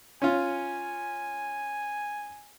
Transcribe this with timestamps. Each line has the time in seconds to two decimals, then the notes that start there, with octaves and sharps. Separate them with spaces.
0.22 C#4 F4 G#5